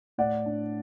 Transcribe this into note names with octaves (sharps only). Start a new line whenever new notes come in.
A2 D5 F#5
D4